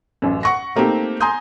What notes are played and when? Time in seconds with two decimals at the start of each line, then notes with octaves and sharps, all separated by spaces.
0.22 A1 F#2
0.43 F#5 C#6 A#6
0.76 A3 A#3 C4 D#4 G4
1.20 G#5 A#5 C6 D#6 G6